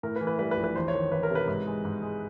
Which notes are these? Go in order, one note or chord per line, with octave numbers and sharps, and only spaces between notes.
A2 A#4
B4
E3
B4
G3 B4
B4
A#1
B4
E2 C5
C#5
D#3
E2 B4
A#4
C3
B4
G#2
G#3
G#2
G#3